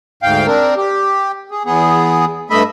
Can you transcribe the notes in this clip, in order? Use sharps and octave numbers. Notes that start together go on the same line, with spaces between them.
D2 G#2 F5 G5
C4 D4 A#4
G4
G#4
E2 B3 G#4
G2 A3 D#5 E5 B5